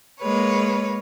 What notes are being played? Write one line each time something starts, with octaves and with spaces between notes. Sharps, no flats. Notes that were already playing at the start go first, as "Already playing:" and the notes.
G#3 A#3 B4 C#5